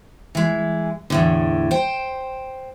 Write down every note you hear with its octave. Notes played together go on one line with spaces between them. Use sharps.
E3 G#3
E2 A2 D3
C5 G5